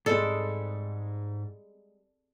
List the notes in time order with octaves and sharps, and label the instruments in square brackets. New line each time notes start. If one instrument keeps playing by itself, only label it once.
[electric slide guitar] G#2 [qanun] G3 G#3 C4 [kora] A4